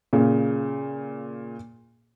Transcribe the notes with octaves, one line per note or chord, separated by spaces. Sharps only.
A#2 C#3